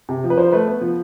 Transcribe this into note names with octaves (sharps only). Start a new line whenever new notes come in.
C3
F3
B4
F3 C5
A3 B4
B3
F3